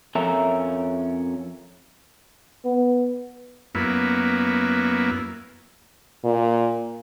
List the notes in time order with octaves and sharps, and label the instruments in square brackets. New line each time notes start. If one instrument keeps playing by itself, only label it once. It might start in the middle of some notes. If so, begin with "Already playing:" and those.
[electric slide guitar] F2 C#4 A4 A#4 E5 A#5
[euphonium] B3
[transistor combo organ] F#2 A#3 B3 E4
[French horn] A#2